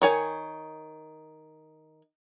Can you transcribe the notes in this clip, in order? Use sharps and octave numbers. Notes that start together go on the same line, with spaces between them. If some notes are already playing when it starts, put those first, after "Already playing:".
D#3 C#5 G#5